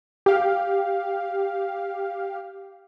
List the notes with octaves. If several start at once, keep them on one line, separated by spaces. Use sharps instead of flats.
G4 F5